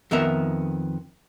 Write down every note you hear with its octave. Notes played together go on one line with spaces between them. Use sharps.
F2 D#3 B3 A#4 E5